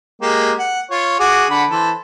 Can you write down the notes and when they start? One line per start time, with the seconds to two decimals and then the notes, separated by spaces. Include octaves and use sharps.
0.22 G#3 A#3 G4
0.58 F#5
0.91 F4 C#5
1.20 F#4 G#4 D6
1.50 D3 F#5 B5
1.71 E3 A4 C5